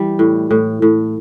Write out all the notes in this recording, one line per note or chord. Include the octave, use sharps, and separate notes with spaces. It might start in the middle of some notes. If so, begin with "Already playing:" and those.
Already playing: E3 G3
A2
A2
A2